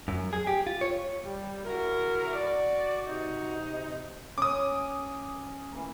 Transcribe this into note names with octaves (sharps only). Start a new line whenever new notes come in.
F#2
G#4
G4
F4
C#5
G3
C#3 E4 F#4 A#4
D5
C3 D#4
C#4 D6 D#6
E3 A#3